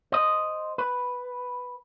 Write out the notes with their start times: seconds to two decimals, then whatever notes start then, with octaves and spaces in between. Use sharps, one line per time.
0.12 C5 D#5
0.78 B4